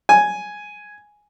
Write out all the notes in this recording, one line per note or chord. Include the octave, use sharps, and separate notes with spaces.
G#5